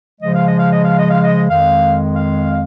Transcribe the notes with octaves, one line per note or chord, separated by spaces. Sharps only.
C#3 F3 G#3 D#5
F5
D#5
F5
D#5
F5
D#5
F5
D#5
F2 D#3 G#3 F5
F5